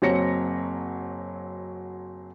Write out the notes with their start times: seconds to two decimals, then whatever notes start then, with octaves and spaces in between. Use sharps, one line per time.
0.02 F#1 F#3 C4 C#5 A#6 C#7